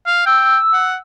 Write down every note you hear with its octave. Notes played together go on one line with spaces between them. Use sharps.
F5
G5 E6
F#5